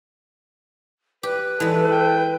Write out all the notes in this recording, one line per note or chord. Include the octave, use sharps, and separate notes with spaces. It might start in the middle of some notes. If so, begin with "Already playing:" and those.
G4 B4
E3 G#3 A4
G5